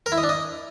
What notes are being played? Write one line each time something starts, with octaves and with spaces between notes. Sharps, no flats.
A#4
E4
D#5
D4
D#5